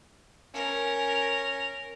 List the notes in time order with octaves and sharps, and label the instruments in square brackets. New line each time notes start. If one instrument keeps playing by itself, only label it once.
[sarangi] C#4 [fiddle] A#4